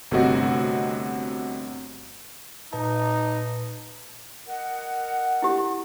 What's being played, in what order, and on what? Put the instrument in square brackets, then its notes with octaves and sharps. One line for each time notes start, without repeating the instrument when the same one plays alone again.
[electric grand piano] G1 C3 A3 C4 F#4 D#5
[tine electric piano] A#2 B4 A5 [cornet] D#4
[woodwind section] A#4 D#5 F#5
[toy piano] E4 G4